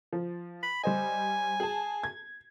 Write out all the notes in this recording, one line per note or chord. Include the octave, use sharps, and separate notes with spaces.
F3
B5
G3 C5 D#5 G#5
G#4 A5
G#6